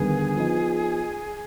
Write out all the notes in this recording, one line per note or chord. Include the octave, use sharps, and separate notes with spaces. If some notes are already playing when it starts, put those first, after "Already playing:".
Already playing: D#2 D3 G3 B3 G#4
F3 B3 D#4